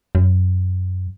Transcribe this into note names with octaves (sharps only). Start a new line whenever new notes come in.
F#2